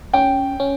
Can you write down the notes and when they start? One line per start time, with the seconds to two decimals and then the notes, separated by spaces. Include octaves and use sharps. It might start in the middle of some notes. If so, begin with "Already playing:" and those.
0.13 C#4 G5
0.60 C#4